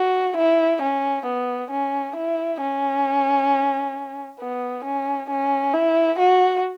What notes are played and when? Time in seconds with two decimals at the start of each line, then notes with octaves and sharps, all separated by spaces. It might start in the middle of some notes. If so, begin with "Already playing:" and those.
Already playing: F#4
0.37 E4
0.82 C#4
1.26 B3
1.71 C#4
2.16 E4
2.60 C#4
4.40 B3
4.84 C#4
5.30 C#4
5.74 E4
6.19 F#4